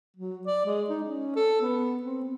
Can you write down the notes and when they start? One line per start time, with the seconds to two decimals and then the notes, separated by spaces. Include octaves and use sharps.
0.17 F#3
0.47 D5
0.66 G#3
0.90 D#4
1.03 C#4
1.36 A4
1.62 B3
2.03 C4
2.24 B3